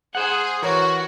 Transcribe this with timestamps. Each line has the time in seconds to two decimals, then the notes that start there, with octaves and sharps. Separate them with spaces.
0.15 G#4 C5 F#5
0.62 E3 F#4 A#4 C#5